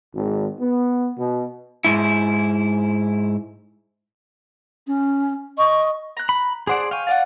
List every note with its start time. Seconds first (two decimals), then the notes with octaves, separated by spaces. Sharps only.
0.15 G#1
0.61 B3
1.18 B2
1.85 G#2 E4
4.87 C#4
5.58 D#5 C#6
6.17 A#5 F#6
6.29 B5
6.67 D4 G#4 C5 D5 F#5
6.91 F5 G5 G#5 C#6
7.07 F4 D5 F#5